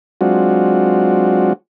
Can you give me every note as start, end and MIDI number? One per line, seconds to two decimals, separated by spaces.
0.21 1.53 54
0.21 1.53 56
0.21 1.53 60
0.21 1.53 62
0.21 1.53 65
0.21 1.53 66